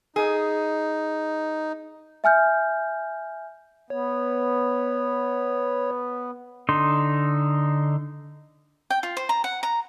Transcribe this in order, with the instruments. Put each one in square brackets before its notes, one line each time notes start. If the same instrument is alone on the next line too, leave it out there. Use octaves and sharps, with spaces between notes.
[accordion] D#4 [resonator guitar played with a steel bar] G#4
[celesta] E5 G#5 F6 G6
[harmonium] B3 [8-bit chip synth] C#5
[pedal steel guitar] D3 D#4 C6
[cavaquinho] G5
F4
C5
A#5
F#5
A#5